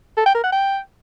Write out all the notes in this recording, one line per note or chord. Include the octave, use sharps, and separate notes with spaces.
A4
G5
A#4
F#5
G5